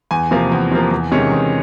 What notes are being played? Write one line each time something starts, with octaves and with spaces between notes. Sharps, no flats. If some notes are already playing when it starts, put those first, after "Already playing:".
E2 G#5
C3 F3 A#3
E2
C3 F3 A#3
E2
C3 D#3 G#3 C#4
E2